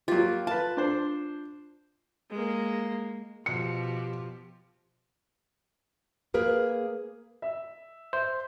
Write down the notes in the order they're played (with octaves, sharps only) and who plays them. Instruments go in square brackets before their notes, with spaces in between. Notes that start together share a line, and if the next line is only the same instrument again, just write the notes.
[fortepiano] F#3 G4 [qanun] A#3 F4
[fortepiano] F4 B4 [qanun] A5
[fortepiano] D4 C5
[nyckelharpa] G#3 A#3
[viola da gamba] B2 F3 G4 [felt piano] C#7
[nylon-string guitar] A#3 G#4 A#4 B4
[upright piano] E5
[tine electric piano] C5 [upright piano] E5